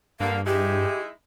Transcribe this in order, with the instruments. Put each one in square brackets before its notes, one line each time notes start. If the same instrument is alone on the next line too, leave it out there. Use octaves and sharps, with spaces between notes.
[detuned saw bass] G2 [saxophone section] D3 A#3 [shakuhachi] F5
[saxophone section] G#3 D#4 E4 [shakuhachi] G4